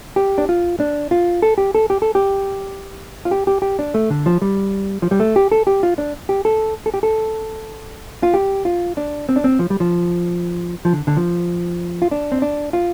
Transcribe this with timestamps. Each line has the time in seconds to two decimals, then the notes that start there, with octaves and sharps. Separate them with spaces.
0.16 G4
0.38 D4
0.49 F4
0.80 D4
1.11 F4
1.42 A4
1.58 G4
1.75 A4
1.90 G4
2.02 A4
2.15 G4
3.25 F4
3.31 G4
3.47 G4
3.62 G4
3.79 D4
3.94 A3
4.10 D3
4.26 F3
4.42 G3
5.02 F3
5.11 G3
5.20 A3
5.36 G4
5.52 A4
5.67 G4
5.83 F4
5.98 D4
6.29 G4
6.45 A4
6.86 A4
6.94 G4
7.03 A4
8.23 F4
8.34 G4
8.65 F4
8.97 D4
9.29 C4
9.36 D4
9.44 C4
9.59 F3
9.70 G3
9.80 F3
10.85 F3
10.93 D3
11.07 D3
11.17 F3
12.02 F4
12.11 D4
12.32 C4
12.42 D4
12.73 F4